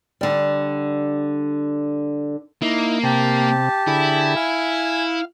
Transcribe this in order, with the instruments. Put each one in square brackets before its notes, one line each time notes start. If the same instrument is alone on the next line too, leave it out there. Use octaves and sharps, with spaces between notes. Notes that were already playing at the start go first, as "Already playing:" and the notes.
[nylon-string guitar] D3 G3
[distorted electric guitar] A#3 [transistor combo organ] D#4 E4
[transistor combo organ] C3 [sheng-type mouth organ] G4 A5
[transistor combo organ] D3 G#4 [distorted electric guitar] E4
[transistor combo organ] F5 [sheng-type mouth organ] G#5